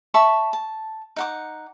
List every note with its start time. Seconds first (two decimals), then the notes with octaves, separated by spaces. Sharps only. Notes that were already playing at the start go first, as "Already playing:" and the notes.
0.14 E5 A5 B5 C#6
0.53 A5
1.16 D#4 F#5 D6